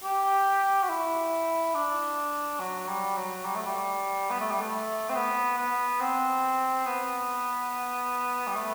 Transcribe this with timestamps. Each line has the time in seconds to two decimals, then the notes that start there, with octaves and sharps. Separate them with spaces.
0.04 G4
0.84 F#4
0.89 E4
1.74 D4
2.60 F#3
2.88 G3
3.17 F#3
3.45 G3
3.56 A3
3.66 G3
4.30 B3
4.40 A3
4.51 G3
4.61 A3
5.09 C4
5.15 B3
5.58 B3
6.00 C4
6.86 B3
8.47 G3
8.56 A3